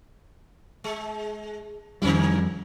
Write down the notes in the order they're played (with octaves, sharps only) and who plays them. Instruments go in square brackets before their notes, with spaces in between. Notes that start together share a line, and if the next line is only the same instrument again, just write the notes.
[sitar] G#3
[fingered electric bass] F2 G3 [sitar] D3 C#4 E4